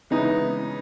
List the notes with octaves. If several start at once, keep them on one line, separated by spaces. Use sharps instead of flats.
C#3 E3 G#3 B3 C#4 D#4 E4